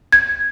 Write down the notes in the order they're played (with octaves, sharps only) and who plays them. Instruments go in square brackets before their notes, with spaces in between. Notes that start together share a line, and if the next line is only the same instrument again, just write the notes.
[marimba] G#6